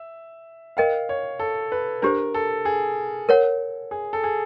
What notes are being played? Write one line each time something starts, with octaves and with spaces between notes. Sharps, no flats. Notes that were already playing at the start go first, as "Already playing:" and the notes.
Already playing: E5
A#4 D#5 F5 G5
C#5
A4
B4
D4 G4 A#4 C5
A4
G#4
A#4 C#5 F#5
G#4
A4
G#4